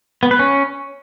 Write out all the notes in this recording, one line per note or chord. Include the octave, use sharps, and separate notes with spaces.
B3
B4
C#4